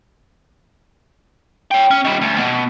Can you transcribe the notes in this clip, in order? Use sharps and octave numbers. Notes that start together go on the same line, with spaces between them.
C#5 G5
C#4
D#3 G3
D2
B2